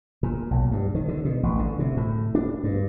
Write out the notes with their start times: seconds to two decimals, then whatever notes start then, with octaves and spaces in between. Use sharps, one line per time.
0.23 A#2
0.51 B1
0.71 G2
0.95 D#3
1.08 D3
1.25 B2
1.43 A1
1.59 D3
1.79 C3
1.97 A2
2.35 D4
2.64 G2